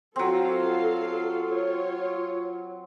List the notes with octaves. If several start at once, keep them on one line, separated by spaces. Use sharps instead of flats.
F#3 C4 F4 A4 F5
F4 C#5